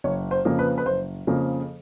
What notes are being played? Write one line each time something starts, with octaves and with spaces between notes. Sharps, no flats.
F#1 C#5
C5
F2 C#3 F3 A#3
B4
B4
F#1 C5
F2 C#3 F3 A#3